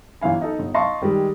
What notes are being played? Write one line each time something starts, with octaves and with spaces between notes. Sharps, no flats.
G1 E3 F5 G#5
D#4 A4
G1
D#5 F5 A5 C6 C#6
D#3 G3 G#3